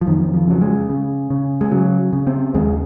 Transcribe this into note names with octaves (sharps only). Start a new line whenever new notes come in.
F3
F2 D#3
F3
C#3 F#3
G#3
C#3
C#3
G#3
C#3 F#3
C#3
C4
D#2 G#3